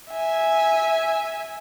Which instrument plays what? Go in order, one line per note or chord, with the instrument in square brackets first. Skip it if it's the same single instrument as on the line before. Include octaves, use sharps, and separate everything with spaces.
[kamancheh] E5 G#5